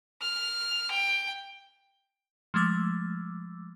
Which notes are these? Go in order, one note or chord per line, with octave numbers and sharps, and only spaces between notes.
F6
G5
F3 G#3 A3 D6 E6